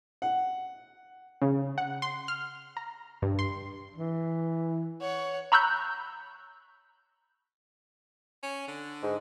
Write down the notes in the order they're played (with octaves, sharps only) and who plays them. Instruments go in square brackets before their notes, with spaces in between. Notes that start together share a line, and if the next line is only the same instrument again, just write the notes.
[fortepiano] F#5
[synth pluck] C#3
F#5
C6
F6
A#5
G2
C6
[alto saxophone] E3
[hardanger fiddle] C#5 F#5
[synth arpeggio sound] A#5 B5 C#6 E6 F#6 G6
[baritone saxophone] C#4
D3
[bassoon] G#2